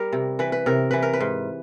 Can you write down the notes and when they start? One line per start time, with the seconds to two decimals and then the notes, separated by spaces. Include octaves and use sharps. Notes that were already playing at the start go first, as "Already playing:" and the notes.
Already playing: G3 A#4
0.13 C3
0.39 E3 B4
0.52 B4
0.66 C3 A#4
0.91 E3 B4
1.02 A#4
1.13 B4
1.20 G#2